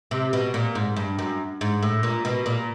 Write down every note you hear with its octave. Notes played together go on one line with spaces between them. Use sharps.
C3
B2
A#2
G#2
G2
F#2
G#2
A2
A#2
B2
A#2